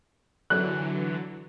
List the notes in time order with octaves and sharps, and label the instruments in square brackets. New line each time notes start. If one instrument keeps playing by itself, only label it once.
[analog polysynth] D3 E3 F#3 [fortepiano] F#6